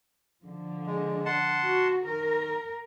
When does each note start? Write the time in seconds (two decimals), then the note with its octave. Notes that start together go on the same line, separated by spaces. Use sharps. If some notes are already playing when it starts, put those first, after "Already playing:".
0.44 D3 F3
0.87 G#3
1.25 F#5 A5 C6
1.62 F#4
2.06 D#3 A#4